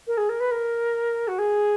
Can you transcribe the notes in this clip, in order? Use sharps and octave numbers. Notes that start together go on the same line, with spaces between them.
A#4
G#4
A#4
B4
A#4
F#4
G#4